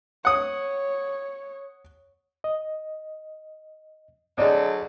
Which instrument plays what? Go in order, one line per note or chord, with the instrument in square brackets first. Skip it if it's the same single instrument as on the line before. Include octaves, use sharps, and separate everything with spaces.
[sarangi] C#5 [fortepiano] F#5 D#6
[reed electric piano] D#5
[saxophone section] D2 F#3 [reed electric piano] G#4 D#5 [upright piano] D5